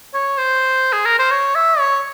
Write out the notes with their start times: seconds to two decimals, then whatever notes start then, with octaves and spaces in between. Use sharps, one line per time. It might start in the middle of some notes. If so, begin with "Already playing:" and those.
0.14 C#5
0.38 C5
0.93 G#4
1.06 A#4
1.19 C5
1.31 C#5
1.55 E5
1.79 C#5